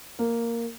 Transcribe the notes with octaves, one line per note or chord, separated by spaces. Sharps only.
A#3